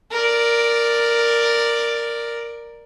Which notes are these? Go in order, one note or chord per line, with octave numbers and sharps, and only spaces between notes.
A#4 D5